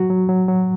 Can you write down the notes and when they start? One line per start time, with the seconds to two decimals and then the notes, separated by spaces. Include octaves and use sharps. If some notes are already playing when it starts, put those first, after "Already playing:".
Already playing: F#3 F#4
0.10 F#3
0.29 F#3
0.48 F#3